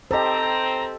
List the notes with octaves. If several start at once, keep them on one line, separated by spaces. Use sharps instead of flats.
C4 G4 A4 C5 D#5 A#5